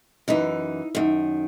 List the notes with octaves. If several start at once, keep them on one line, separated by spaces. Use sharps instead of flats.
F#2 E3 D#4
F#2 D#3